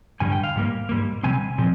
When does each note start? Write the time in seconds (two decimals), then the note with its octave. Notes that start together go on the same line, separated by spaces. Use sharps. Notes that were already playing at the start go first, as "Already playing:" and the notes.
0.20 G2 D3 G3 G#5
0.32 G5
0.43 F5
0.56 G#2 G3 A#3
0.89 G#2 G3 A#3
1.23 C3 G3 C4 G#5
1.58 A#2 F3 C4